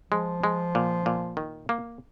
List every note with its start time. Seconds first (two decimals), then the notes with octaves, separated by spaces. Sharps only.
0.11 F3 G#3
0.44 G#3
0.75 A#2
1.06 A#2
1.37 D#3
1.69 A#3